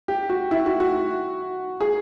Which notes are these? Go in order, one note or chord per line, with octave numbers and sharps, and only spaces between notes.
G4
F#4
E4
F#4
F#4
G#4